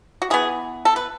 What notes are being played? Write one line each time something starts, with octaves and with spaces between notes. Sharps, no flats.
F#4
E3 B3 G#4
A4
B4